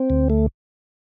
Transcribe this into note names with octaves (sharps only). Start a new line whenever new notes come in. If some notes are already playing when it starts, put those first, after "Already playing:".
Already playing: C4
D2
A3